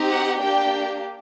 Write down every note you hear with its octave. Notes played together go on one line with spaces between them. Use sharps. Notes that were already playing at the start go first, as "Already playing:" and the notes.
Already playing: C4 D#4 G4
F#5
A#3 D4 G4 G5